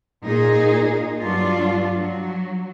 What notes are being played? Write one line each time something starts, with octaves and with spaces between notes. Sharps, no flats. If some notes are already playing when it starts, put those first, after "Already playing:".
A#2 D#4 G#4
G2 F#3 D4 F4
F#3